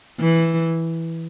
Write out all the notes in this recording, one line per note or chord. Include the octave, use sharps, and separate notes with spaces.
E3